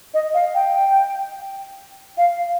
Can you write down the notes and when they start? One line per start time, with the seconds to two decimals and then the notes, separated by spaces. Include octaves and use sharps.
0.14 D#5
0.34 F5
0.55 G5
2.18 F5